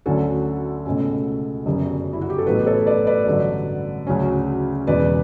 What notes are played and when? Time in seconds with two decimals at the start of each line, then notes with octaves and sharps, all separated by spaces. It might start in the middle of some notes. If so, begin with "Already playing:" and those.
0.06 D2 D3 F#3 C#4 F#4 A4
0.86 C#2 B2 A3 C#4
1.66 G1 F#2 C#3 G3
2.13 E4
2.21 F#4
2.30 G4
2.38 A4
2.46 A1 A2 F#3 B3 G4 B4
2.66 A4 C#5
2.87 B4 D5
3.07 B4 D5
3.26 A1 G2 D3 F#3
4.07 D2 C#3 F#3 C#4
4.87 E1 E2 C#3 B4 D5